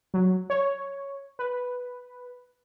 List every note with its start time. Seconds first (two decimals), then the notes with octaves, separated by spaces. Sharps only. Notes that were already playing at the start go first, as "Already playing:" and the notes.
0.14 F#3
0.50 C#5
1.39 B4